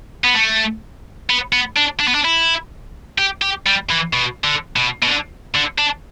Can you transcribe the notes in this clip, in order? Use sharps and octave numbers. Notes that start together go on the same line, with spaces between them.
B3
A3
B3
B3
D4
D4
B3
D4
E4
G4
G4
G3
E3
B2
D3
B2
B2
D3
D3
D4